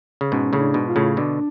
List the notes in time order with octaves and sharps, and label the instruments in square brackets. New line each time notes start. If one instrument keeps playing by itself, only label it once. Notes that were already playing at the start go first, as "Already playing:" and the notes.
[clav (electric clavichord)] C#3
[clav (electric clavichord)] G#2 B2 [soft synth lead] C#4
[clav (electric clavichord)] A2 C#3
[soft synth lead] D4
[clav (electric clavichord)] G#2 B2
[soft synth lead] F4
[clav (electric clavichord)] A2 C#3
[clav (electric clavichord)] B2 D3 [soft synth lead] D4